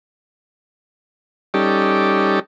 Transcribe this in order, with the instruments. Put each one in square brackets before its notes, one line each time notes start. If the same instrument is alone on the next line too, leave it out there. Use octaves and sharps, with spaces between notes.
[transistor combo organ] G3 C#4 D#4 G4 A4 D5